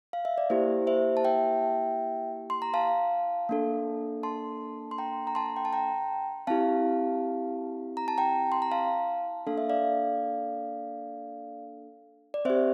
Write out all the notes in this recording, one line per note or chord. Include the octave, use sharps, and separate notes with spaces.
F5
E5
D5
A#3 E4 G4 C5
C5 E5
A5
E5 G5
C6
A#5
F5 A5
A#3 D4 A4
A5 C6
C6
G5 A#5
A#5
A5 C6
G5
A5
G5 A#5
C4 E4 G4 F5 A5
A#5
A5
G5 A#5
C6
A#5
F5 A5
A#3 D4 A4 F5
E5
D5 F5
D5
C4 G4 C5 E5